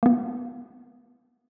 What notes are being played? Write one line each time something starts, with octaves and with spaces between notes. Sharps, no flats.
A#3 B3